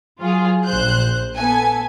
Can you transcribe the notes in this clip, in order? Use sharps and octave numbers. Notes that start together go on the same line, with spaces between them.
F#3 F4 G#4
A#1 C5 F#6 G6
B3 A4 G#5